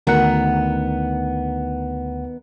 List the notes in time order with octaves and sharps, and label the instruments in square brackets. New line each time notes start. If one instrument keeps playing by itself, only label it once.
[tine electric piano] D2 F#5 [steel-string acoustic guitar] D#3 B3 A#5